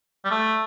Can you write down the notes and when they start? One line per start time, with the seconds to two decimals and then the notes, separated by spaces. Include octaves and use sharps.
0.25 G3
0.31 A3